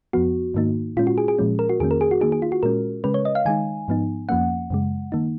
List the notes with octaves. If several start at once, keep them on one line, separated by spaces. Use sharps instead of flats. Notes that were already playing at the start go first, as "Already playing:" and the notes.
F2 F3 B3 F#4
G#2 D#3 A#3 D#4
A#2 G#3 C#4 F4
F#4
G#4
G#4
A#2 F3 G#3 C#4
A#4
F#4
F2 D#3 A#3 C#4 G#4
A#4
G#4
F#4
D#3 A#3 D#4 G#4
G#4
F4
F#4
A#2 G#3 C#4 A#4
C#3 G#3 C#4 B4
C#5
D#5
F5
D#3 G#3 D#4 G#5
G#2 F3 B3 D#4
F2 F3 A#3 C#4 F#5
F#2 C#3 G#3
D#3 A#3 D#4